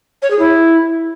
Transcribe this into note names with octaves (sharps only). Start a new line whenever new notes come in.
C#5
G#4
E4